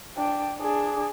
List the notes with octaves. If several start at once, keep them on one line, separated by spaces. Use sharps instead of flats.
D4 G5
D4 G#4